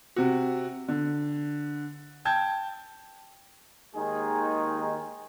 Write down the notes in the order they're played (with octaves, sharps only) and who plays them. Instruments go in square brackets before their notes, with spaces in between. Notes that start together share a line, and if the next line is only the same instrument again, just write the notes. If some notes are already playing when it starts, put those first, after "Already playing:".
[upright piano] C3 F#4
D3
G5 A5 G6 G#6
[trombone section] D#2 D#3 G#3 D#4 G#4